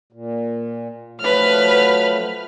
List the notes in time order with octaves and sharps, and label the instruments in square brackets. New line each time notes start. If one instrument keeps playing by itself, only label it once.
[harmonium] A#2
[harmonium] F3 F#3 A3 [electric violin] B4 F6